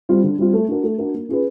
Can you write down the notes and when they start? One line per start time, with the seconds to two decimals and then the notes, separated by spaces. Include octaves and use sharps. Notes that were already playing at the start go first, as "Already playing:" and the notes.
0.09 G3 C4 F4
0.24 D3
0.39 G3 C4 F4
0.54 A3
0.69 D4 F#4 A#4
0.84 A3
0.98 D4 F#4 A#4
1.14 A#3
1.29 C#4 F4 G#4 B4